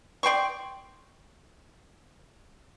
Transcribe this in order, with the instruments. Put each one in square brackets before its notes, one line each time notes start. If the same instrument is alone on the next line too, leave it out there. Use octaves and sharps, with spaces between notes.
[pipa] D5 G5 C6 C#6